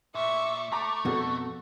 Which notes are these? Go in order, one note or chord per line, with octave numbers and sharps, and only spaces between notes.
A#2 E5 C#6
A3 A5 A#5 C#6 D6
F2 B2 F#4 A4